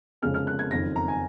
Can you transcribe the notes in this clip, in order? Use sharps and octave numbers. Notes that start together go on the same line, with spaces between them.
F1 F2 C#3 G#3 C#4 F6
F6
F#6
G#6
F#1 F2 D#3 A#6
A#5
G#5